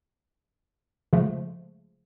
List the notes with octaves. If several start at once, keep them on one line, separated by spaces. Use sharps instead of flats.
C#3 F3 G#3 A3